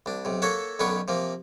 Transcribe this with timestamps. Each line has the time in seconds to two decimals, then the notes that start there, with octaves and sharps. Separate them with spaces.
0.06 C2 D4
0.25 B1 C3
0.42 A#3 A4 C#5 E5 F#5
0.79 B1 D3 D#3 B3 C#4 C#6
1.08 C3 F3 A#3